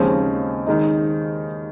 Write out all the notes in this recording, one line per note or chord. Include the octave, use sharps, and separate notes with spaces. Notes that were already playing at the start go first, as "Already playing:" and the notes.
Already playing: D#2 C#3 F3 G#3 C4 C#4 D#4
D#3 G#3 D#4